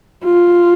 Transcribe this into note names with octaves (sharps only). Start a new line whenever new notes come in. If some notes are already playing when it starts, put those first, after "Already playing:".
F4